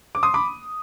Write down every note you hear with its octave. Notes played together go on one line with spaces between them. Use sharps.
D6
C6 D#6
B5 D6